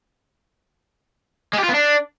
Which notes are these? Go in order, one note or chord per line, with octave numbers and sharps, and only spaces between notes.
G#3
G4
F4
B3
D4